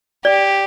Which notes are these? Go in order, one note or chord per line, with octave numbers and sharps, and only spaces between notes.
G4 D5